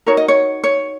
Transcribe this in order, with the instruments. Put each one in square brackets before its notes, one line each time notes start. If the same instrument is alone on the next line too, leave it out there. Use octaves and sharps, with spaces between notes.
[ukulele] D#4 F#4 A#4 C#5
D#5
C#5
C#5